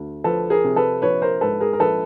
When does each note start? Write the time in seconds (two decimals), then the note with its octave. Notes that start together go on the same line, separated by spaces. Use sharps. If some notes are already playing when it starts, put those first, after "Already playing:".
Already playing: D2
0.24 F3 A4 B4
0.50 G#4 A#4
0.64 C3
0.76 A4 B4
1.02 A#1 B4 C#5
1.22 A#4 C5
1.41 G#2 A4 B4
1.60 G#4 A#4
1.73 A#4
1.80 A#1 A4 B4